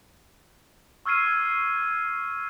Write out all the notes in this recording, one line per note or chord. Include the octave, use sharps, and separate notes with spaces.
C#6 E6 F6 G#6 C7 D#7